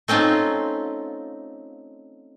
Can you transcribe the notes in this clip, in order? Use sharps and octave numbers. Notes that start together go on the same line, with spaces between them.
A3 C4 C#4 D#4 F4